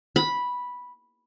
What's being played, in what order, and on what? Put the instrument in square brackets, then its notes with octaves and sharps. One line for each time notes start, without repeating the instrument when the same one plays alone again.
[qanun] B5